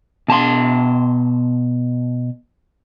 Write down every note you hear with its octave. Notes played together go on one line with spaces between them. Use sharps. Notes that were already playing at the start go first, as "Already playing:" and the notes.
B2 A5 A#5 C6